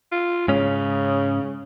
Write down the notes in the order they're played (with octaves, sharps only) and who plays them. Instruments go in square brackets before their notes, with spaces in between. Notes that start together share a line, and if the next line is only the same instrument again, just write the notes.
[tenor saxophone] F4
[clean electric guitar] G#2 C#4 [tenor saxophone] C#3